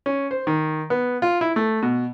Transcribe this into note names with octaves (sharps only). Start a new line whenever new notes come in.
C#4
C5
D#3
B3
F4
E4
A3
B2